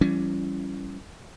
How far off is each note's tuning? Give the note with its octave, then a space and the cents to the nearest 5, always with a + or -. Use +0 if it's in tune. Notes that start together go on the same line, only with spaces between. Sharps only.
E3 +30 G3 -20 C#4 +0